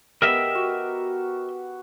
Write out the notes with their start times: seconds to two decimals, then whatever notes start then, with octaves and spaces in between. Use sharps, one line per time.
0.22 B3 G4 A#4 D#5 E5
0.55 F#4